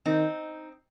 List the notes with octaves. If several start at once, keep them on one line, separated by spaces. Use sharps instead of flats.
D#3 C4 D#4